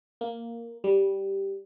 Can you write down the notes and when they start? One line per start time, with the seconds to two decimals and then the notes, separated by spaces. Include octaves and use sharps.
0.21 A#3
0.84 G3